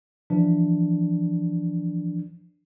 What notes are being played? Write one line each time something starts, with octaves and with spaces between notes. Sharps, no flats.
E3 F3 D4